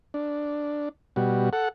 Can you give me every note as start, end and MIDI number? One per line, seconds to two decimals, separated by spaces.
0.14 0.89 62
1.16 1.50 47
1.16 1.50 55
1.16 1.50 66
1.53 1.69 69
1.53 1.69 78